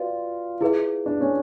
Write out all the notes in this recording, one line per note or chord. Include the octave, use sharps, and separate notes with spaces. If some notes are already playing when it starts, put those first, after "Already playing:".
Already playing: F4 F#4 B4 D5
E4 G#4 B4 E5
D4
C#4